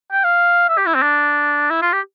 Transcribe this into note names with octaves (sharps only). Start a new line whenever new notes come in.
G5
F5
E5
G4
E4
C4
D4
E4
F4
G4